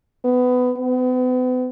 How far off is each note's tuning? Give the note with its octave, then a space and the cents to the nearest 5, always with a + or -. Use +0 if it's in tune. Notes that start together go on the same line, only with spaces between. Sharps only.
B3 +20
B3 +40